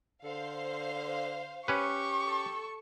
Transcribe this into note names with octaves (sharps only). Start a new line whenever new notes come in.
D3 C5 F5
C#4 G4 B4 C#6
A4